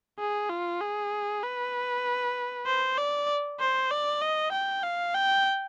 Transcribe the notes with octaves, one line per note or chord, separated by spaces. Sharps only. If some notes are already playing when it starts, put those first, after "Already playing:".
G#4
F4
G#4
B4
C5
D5
C5
D5
D#5
G5
F5
G5